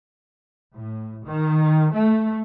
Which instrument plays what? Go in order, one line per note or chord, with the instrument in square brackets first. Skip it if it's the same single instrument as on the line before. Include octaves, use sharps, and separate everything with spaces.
[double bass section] A2
D#3
A3